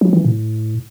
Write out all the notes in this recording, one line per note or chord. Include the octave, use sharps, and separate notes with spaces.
F#3
E3
A2